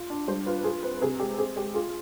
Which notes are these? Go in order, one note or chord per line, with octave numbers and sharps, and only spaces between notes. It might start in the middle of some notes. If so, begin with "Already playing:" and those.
Already playing: F4
D4
G3 C5
F4 B4
F4 G#4
C4 B4
C3 G#4
G#3 G4
C4 G#4
G#3 G4
F4 G#4